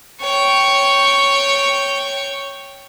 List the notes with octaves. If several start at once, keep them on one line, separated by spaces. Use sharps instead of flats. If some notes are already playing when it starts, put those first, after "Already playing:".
C#5 G5